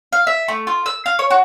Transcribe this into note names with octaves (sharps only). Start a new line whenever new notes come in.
F5
E5
A3
F4
E6
F5
C#5
F#4